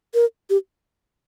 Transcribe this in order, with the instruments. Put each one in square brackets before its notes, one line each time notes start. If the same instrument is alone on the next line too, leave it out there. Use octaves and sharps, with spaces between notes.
[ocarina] A#4
G4